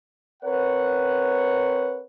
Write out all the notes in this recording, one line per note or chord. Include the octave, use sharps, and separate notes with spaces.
C4 A#4 B4 C#5 F#5